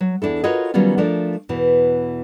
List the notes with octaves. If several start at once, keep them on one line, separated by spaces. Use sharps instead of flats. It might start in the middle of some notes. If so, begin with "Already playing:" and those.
F#3
E2 D4 E4 A4
F4 F#4 A#4 B4 C#5 D#5
D#3 F#3 G3 B3 C#4 F4
F3 A3 D4 A#4 D5
E2 B2 E3